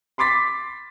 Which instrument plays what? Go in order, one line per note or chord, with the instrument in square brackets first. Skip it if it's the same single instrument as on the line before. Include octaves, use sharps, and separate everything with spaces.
[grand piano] B5 C6 D6 A6 B6